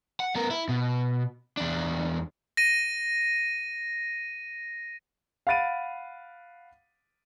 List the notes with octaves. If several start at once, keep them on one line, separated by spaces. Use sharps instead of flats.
F#5
B3 A#4
E4
B2
E2 D4
A#6 D#7
F5 F#5 B5 A6 D7 D#7